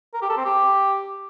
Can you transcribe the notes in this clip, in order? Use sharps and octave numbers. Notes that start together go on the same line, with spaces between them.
A#4
G4
A4
C4
G4